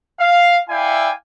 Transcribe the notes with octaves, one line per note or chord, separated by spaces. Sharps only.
F5
E4 D5 E5 F5 G5 G#5